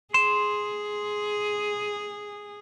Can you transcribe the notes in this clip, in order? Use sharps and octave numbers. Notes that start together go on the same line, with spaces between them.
G#4 C6 E7